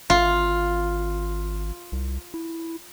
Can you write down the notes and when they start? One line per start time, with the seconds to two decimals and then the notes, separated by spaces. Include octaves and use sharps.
0.10 G#1 F4
1.92 C2
2.34 E4